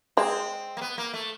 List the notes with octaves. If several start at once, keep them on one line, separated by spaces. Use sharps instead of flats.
G#3 C4
A#3
B3
A#3
A3